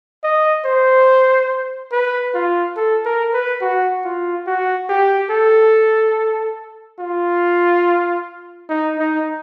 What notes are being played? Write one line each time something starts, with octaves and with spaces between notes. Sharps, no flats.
D#5
C5
B4
F4
A4
A#4
B4
F#4
F4
F#4
G4
A4
F4
D#4
D#4